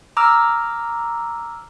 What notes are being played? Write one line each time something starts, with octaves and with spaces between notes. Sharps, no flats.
A#5 D6 E6 F6